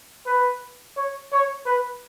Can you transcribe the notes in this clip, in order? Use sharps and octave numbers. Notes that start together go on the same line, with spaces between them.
B4
C#5
C#5
B4